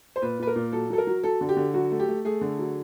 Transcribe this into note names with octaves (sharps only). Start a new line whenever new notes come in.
C5
A#2 B4
A#2 B4
A#4
A#2
F#3 A4
F#3 A4
A#4
F#3
F#3 A4
D3
G4
D3
F#3 F#4
A3
G4
A3
A3 G#4
D3
F#3